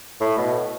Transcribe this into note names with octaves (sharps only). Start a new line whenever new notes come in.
A2
B2